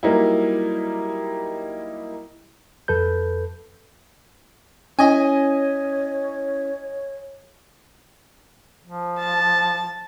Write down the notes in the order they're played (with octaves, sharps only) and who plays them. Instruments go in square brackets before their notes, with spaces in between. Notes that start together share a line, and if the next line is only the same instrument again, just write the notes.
[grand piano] F#3 G3 A#3 D#4 E4
[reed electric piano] F2 A4 B4 G6
[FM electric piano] C#4 E4 [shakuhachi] C#5 [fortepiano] D#5 G#5
[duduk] F3
[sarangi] A5